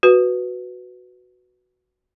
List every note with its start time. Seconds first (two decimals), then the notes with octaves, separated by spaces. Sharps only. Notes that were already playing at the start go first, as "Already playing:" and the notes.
0.03 F#4 B4